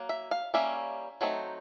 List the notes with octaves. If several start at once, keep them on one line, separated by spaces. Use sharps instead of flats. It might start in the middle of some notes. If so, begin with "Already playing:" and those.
Already playing: F#3 A#3
E5
F5
G3 A#3 C#4 E5
F#3 A3 C4 D#4